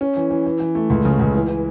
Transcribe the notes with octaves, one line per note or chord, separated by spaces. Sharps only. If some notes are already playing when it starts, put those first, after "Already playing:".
C#4
E3
E3
E3
E3
A3
C#2
C#3
C#2
E3
E3